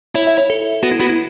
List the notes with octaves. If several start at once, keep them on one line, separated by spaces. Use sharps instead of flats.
E4 C#5
E5
C#5
A4
B3 F#4
E4
B3 F#4
E4